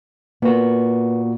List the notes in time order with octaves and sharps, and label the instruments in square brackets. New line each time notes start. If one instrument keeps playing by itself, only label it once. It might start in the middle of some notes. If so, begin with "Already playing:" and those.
[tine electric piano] A#2 F#4 [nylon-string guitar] B3